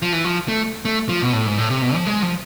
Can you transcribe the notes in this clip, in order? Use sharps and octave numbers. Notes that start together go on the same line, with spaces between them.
F3
E3
F3
A3
A3
F3
B2
A2
G#2
A2
C3
B2
F3
G#3
F3